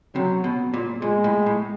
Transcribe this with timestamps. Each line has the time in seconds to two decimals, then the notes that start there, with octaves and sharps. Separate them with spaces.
0.15 C3 F#3
0.44 B2
0.74 A#2
1.02 A#2 G#3
1.24 A2
1.46 A2